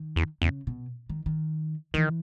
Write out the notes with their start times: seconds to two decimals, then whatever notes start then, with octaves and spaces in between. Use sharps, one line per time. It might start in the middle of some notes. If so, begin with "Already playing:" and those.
Already playing: D#3
0.16 E2
0.42 E2 C#3
0.67 B2
1.09 D#3
1.26 D#3
1.94 D#3 E3